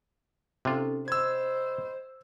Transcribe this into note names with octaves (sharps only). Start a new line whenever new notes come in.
C3 C#4 D#4 F4 A4
C5 D#5 B5 C6 E6 G#6